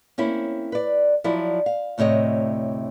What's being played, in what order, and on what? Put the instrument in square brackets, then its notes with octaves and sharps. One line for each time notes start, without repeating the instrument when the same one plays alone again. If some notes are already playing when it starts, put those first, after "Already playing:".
[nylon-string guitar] A#3 C4 C#4 E4
B4 D5
F3 F#3 E4 F4 D5
F5
D2 A2 C3 C#5 D#5